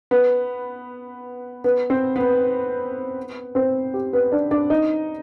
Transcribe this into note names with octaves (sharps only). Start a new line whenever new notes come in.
B3 B4
B3 B4
C4 C5
B3 B4
C4 C5
G4
B3 B4
D4 D5
D4 D5
D#4 D#5